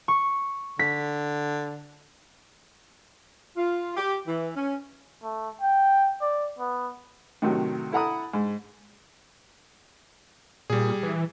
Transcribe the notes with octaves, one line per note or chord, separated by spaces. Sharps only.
C#6
D3 B6
F4
G4
E3
C#4
A3
G5
D5
B3
A2 C3 D#3 F#3
E4 A4 F#5 A#5 B5 D#6
G#2
A#2 G3 G#4
E3